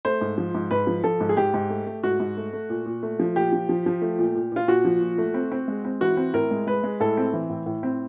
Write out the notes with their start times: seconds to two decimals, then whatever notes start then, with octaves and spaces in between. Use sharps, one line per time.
0.05 A3 C5
0.21 G#2
0.38 F3
0.55 G#2
0.71 G#2 B4
0.87 F3
1.04 F3 A4
1.21 G#2
1.29 G#4
1.37 G#2 G4
1.54 G#2
1.70 A3
1.86 A3
2.03 G#2 F#4
2.20 G#2
2.37 A3
2.53 A3
2.69 A#2
2.86 A#2
3.03 A3
3.20 F3
3.36 A#2 G4
3.53 F3
3.69 F3
3.86 F3
4.02 A3
4.19 A#2
4.35 A#2
4.52 A#2 F4
4.68 A#2 F#4
4.85 F3
5.01 A#2
5.18 A3
5.34 C4
5.51 C4
5.68 G#3
5.85 C4
6.01 E3 F#4
6.17 C4
6.33 A2 A#4
6.51 G#3
6.67 G#3 B4
6.84 G#3
7.00 A2 A4
7.17 C4
7.33 E3
7.50 A2
7.66 A2
7.83 C4